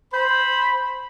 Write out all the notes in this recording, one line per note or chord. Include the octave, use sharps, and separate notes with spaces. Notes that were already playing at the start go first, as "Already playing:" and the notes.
C5 B5